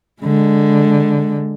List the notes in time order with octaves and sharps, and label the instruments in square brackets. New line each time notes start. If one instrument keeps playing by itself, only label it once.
[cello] D3 G#3